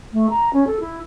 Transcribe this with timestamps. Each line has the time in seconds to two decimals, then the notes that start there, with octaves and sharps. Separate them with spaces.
0.12 A3
0.30 A#5
0.53 C#4
0.66 A4
0.80 E4